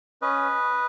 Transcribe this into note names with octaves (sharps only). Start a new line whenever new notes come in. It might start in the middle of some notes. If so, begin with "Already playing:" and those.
C#4 B4 D#5